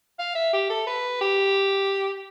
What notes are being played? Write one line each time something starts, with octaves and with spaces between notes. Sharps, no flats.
F5
E5
G4
A4
B4
G4